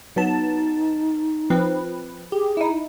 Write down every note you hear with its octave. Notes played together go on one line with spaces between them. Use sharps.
F#3 B3 D#4 A5
F3 C4 B4
G4 G#4
D#4 E4